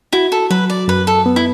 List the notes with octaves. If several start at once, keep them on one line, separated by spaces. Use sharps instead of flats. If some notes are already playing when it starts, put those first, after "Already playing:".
E4 F#4
A4
F#3 B4
D5
F#2 B4
A4
B3
E4